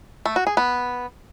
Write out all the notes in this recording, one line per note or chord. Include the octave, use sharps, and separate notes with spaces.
A3
F#4
G#4
B3